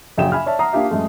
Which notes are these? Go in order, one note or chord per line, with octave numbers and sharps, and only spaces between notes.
A#1 F#2 C#3 F#4 G5 E7
E5 G#5 B5 F6
C#5 D5 E5 A5
E5 F#5 A#5 D#6 C7
A#3 D4 F4 G4 E5
F#2 G#3 A3